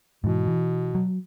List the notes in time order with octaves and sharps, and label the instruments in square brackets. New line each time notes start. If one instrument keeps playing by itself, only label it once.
[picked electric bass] G#2 E3 [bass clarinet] B2
[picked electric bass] E3
F#3